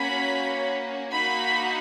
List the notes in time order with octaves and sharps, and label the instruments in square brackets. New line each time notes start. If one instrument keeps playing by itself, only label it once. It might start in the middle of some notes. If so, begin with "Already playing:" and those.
Already playing: [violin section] A#3 C#4 F#4 B5
A#3 D#4 F#4 B5